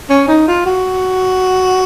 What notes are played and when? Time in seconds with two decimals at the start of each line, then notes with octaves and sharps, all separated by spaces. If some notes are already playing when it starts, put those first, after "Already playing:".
0.10 C#4
0.28 D#4
0.48 F4
0.66 F#4